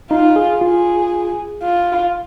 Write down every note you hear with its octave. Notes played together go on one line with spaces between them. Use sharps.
D#4 F4
G#4
F4 G#4
F4